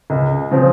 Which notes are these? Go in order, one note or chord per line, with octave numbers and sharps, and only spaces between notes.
C#2
C#3 F3 C4